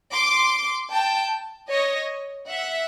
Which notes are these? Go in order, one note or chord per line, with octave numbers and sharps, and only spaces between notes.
C6 D6
G5 A5
C#5 D#5
E5 F#5